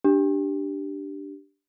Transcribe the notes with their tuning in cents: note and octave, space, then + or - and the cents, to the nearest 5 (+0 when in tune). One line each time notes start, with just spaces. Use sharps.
D4 +0 G4 -10